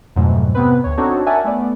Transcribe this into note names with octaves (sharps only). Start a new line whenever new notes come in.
F2 G#2 B2 F#3 A3
C3 B3 C4 B4
D2 C#5
C4 D4 D#4 F#4 A4 C#5
A#4 D5 E5 F#5 G#5 A5
A3 B3 D5